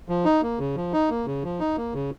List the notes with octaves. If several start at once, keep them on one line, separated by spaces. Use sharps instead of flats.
F3
D#4
A#3
C#3
F3
D#4
A#3
C#3
F3
D#4
A#3
C#3